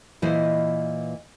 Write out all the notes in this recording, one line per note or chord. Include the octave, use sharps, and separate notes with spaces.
A#2 E3 E4 C5 D#5